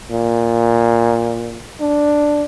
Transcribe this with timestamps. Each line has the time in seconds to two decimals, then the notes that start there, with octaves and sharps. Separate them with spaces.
0.11 A#2
1.81 D4